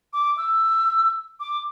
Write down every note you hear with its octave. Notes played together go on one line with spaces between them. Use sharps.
D6
E6
D6